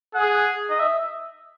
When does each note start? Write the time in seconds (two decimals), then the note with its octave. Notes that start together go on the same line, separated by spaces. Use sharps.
0.15 G#4 F#5
0.70 D#5
0.79 E5